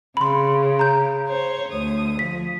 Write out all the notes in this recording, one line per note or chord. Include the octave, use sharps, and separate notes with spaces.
C#3 B5 C6
A#5 G6
C5 C#5
D2 D#6
F3 B6